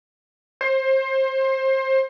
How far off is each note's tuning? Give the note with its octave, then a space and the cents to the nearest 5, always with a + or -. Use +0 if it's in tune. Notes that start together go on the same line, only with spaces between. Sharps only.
C5 +25